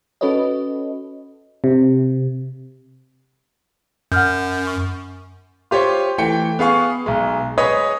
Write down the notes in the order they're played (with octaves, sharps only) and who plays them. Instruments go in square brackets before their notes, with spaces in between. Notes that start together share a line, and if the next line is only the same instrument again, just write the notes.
[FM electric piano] C#4 F#4 A4 B4 C#5 D#5
C3
[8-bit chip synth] F#2 [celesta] F#5 F6 G6
[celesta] C#6
[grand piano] F4 G4 C5 C#5
E3 A3 G5 C#7
B3 G#4 F5 C#6
B1 G#3
G#4 B4 C#5 D#5 B5 D#6